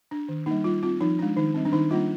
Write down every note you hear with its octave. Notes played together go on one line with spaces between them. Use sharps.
D4
D#3
G3 A#3 D#4
G3 F4
C4 F4
F3 D#4
G#3 D4
D#3 D#4
G3 C4
D4
D#3 D#4
G3 A#3 D4 F4